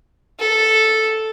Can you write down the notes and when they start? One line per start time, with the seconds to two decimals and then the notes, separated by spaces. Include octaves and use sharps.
0.40 A4